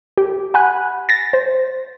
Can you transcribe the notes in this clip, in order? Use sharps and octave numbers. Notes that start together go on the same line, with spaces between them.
G4
F#5 G#5 B5 F#6
A6 A#6
C5